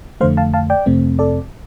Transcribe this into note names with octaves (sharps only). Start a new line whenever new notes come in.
F2 D3 A3 C5 F5
F5 A5
F5 A5
D5 G5
F2 C3 A3 C4
A4 D5